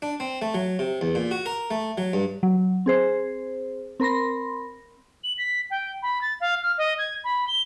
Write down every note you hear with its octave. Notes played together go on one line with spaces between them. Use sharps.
D4
C4
A3
F#3
C3
E2
A#2
F#4
A#4
A3
F#3
G2
F#3
C4 G#4 C5
C4 A#4 B5 C6 A#6
F#7
B6
G5
B5
A6
F5
F6
D#5
G#6
B5
G7